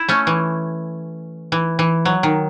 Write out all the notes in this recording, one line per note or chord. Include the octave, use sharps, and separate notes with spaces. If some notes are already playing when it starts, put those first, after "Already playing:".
Already playing: E4
A3 C#4
E3
E3
E3
F#3
D#3